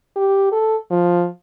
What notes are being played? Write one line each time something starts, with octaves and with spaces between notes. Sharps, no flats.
G4
A4
F3